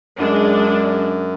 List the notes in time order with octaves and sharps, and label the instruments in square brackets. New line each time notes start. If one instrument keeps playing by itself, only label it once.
[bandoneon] F#2 [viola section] G#3 D4